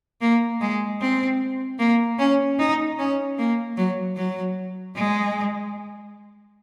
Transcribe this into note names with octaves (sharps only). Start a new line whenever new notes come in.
A#3
G#3
C4
A#3
C#4
D#4
C#4
A#3
F#3
F#3
G#3